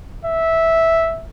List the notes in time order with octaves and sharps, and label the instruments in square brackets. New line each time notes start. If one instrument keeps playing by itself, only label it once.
[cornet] E5